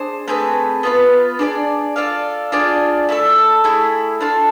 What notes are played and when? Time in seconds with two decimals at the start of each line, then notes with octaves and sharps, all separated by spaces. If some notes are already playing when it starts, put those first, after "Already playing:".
Already playing: D4 G#4 C5
0.28 A3 C4 G#4 B4
0.83 B3 F4 B4
1.39 D4 G#4 B4 D5
1.96 F4 A4 D5 F5
2.52 D4 F4 G#4 D5
3.09 A3 E4 A4
3.64 A3 E4 G#4
4.21 D4 F4 A4